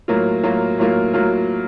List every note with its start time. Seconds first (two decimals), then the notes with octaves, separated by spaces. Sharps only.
0.08 A2 F#3 A#3 F4
0.43 A2 F#3 A#3 F4
0.78 A2 F#3 A#3 F4
1.13 A2 F#3 A#3 F4